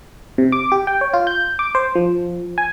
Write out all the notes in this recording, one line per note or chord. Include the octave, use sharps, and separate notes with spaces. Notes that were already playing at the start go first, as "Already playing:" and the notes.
C3
D6
G4
G5
C#5
F4
G6
D6
C5
F3
G#5